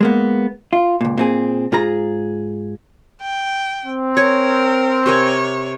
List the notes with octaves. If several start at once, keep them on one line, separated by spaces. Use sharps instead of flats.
G#3 A#3 B3
F4
C#2 A#2
A#2 C4 G#4
G#2 F4 G#4 A#5
G5
C4
A#4 C#5 G#5
C3 A#4 C#5 G#5